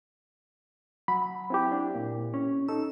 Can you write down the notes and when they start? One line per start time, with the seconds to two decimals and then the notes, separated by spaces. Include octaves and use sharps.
1.08 F#3 B5
1.50 C4 E4 G4
1.72 D4
1.94 A#2
2.34 C#4
2.68 D#4 A4 E6